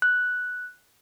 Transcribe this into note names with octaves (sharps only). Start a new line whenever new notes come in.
F#6